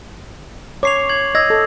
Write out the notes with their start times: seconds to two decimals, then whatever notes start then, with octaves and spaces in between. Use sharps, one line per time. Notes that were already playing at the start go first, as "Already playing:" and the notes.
0.83 C#5 D6 C7 F7
1.09 G#6 F#7
1.35 D#5 E6 G#6 A#6
1.50 A4